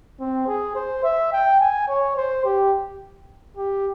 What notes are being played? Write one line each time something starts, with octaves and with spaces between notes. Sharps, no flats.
C4
G#4
C5
E5
G5
G#5
C#5
C5
G4
G4